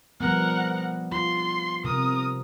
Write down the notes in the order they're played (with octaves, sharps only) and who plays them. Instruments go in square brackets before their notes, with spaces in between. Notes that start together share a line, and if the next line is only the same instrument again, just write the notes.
[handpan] F3 G3 B3 [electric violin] A#4 F#5
[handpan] F4 [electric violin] C6
[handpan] C3 [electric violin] A#4 D#6